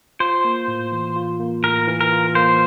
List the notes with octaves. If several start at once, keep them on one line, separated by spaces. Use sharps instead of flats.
F4 C5
A#3
A2
E3
F4
A#3
A2 A#4
E3
A#4
F4
A#3 C5